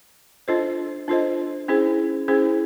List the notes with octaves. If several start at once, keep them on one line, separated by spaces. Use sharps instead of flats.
D4 F4 A4 C5 D#5
D4 F4 A4 C5 D#5
C#4 E4 G#4 C5
C#4 E4 G#4 C5